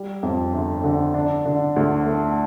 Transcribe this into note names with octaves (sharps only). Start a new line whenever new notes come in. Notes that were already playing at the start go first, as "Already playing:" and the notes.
Already playing: G3
F2
G1
D3
D4
D3
D2
A3